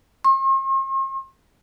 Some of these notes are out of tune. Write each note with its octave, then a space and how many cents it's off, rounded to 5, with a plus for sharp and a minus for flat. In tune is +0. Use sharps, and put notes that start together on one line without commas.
C6 +45